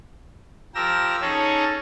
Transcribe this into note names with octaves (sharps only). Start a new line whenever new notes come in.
F3 G4 A#4 E6 A#6
C#4 D#4 G#4 A4 C#5